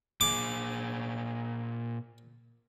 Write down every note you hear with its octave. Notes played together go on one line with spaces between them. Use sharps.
A#2 G#4 D6